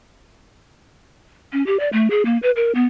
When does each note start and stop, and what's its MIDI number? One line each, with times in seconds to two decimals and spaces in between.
1.53 1.65 61
1.66 1.79 67
1.80 1.89 74
1.93 2.08 57
2.11 2.23 68
2.25 2.38 58
2.43 2.51 71
2.56 2.72 70
2.75 2.86 59